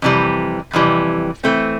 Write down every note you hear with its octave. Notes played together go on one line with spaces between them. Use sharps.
F2 C3 E3 G3
F2 C3 E3 G3
E3 A3 C4